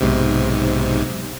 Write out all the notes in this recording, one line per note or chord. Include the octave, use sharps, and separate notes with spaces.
B1 G#2 C3